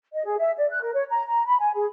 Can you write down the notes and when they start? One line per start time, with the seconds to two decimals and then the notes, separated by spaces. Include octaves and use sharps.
0.13 D#5
0.25 G#4
0.38 E5
0.58 D5
0.70 F#6
0.82 A#4
0.94 C#5
1.10 A#5
1.27 A#5
1.46 B5
1.60 G#5
1.75 G#4